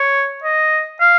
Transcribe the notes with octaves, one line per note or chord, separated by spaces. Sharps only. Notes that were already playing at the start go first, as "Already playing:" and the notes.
Already playing: C#5
D#5
F5